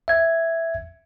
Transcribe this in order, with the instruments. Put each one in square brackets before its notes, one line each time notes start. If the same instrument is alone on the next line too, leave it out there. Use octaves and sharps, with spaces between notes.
[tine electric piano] E5 G#6